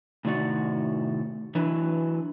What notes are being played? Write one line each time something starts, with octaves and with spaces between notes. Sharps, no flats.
A2 C3 D#3 F#4 D5 F#5
E3 F#3 D4 E4 B4